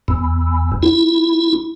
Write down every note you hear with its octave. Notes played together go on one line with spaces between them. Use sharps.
E2
E4